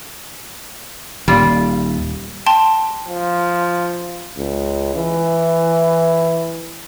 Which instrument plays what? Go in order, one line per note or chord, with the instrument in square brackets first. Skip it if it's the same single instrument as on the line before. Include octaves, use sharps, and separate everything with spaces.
[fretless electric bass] D#1 [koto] G3 F4
[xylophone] G5 A5 C6
[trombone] F3
[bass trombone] C#2
E3